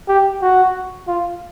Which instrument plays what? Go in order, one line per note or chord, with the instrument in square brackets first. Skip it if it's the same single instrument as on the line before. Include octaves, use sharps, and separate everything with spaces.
[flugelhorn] G4
F#4
F4